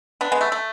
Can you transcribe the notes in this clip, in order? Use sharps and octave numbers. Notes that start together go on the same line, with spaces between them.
B3 D4
G#3 B3
A3
A3